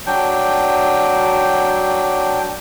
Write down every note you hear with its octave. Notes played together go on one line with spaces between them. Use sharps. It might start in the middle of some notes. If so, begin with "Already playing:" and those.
F#3 D4 G5